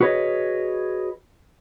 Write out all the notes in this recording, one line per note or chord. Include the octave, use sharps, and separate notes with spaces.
F#4 G#4 B4 C#5 D#5